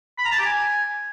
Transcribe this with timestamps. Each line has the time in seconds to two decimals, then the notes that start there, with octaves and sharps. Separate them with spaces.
0.18 B5
0.25 A#5
0.32 A5
0.38 G4
0.45 G#5